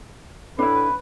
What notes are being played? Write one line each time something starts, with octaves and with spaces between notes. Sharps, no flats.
A2 D4 E4 B4